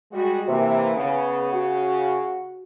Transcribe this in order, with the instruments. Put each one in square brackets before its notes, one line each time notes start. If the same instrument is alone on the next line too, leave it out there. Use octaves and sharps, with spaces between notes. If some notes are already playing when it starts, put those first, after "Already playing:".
[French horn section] G3 G#3 F#4
[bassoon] C3 [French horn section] E3 A#3
[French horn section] C#3 [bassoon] B3
[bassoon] F#4